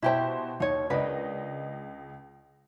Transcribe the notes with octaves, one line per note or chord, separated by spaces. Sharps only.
B2 E4 G4 C5 G5
D#2 D#4 C#5
C#2 D4 A#4 B4 D#5